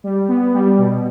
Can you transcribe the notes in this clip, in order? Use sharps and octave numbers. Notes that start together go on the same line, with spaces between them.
G3
B3
G3
B2